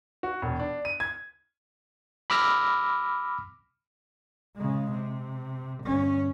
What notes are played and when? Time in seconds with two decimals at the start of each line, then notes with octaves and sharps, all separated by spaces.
0.23 F#4
0.42 E1
0.60 D4
0.85 D#7
1.00 G#6
2.30 B5 D6 E6 F6 A#6 B6
4.56 C#3 G#3
4.91 C3
5.84 G1 C#4